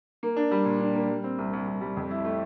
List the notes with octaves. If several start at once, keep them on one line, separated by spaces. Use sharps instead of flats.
A#3
D4
G3
A#2
D4
A#3
G3
C4
C2
C2
C2
G3
F2
E4
A3